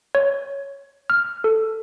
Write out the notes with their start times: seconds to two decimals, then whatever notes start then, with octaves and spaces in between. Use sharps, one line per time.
0.15 C#5
1.10 F6
1.44 A4